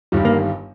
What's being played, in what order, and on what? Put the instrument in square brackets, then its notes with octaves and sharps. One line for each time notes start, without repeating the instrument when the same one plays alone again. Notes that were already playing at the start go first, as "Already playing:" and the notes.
[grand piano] G1 G2 D#3 G3
[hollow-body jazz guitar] A#3